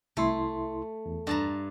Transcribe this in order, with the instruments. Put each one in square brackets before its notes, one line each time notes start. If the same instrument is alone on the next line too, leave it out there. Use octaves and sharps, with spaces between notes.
[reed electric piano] C2 E4 C6 [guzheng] A3
[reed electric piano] E2
[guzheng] G2 A5 A#5